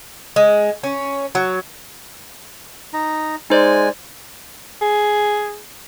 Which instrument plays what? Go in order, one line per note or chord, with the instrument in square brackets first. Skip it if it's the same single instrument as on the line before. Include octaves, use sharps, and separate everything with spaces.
[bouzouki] G#3
C#4
F#3
[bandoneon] D#4 A#5
[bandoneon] G#3 G#5 [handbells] D#4 C5 D5
[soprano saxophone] G#4